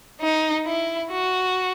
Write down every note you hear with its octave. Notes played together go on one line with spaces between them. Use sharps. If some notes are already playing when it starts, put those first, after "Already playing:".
D#4
E4
F#4